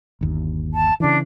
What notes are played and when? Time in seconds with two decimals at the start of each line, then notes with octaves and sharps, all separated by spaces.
0.21 G1 D#2
0.73 A5
1.00 C#3 E3 D4